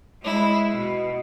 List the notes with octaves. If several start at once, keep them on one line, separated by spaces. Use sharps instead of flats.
G#3 E4
B2